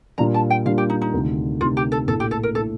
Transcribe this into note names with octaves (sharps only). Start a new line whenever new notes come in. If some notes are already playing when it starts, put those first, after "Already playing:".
A#2 G3 D4 F4 A#5
A5
G5
A#2 G3 D4 F4 F5
G4
D#4
D#4
D2 C3 D#3
D2 C3 D#3 F4
G4
A4
A#1 A2 A3 A4
G4
A4
A#4
A2 A3 A4